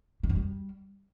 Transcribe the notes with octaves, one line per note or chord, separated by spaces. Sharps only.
D#3
F#2
G3